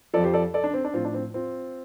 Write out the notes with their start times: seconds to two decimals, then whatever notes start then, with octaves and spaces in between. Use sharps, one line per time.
0.14 F3 A4 D5
0.17 F2
0.24 G4 C5
0.33 A4 D5
0.54 A4 D5
0.64 D4
0.74 C4
0.85 D4
0.94 A2 F3 C4 F4
1.05 D4
1.14 C4
1.34 C4 F4